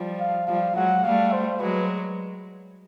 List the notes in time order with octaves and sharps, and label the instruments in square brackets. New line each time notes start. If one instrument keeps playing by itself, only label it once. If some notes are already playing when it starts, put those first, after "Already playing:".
Already playing: [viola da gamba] F3 G3
[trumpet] F5
[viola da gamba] F3 G3 [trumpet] F5
[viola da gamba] F#3 G#3 [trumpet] F#5
[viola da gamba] G3 A3 [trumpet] F5
[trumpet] C5
[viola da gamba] F#3 G#3 [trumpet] B4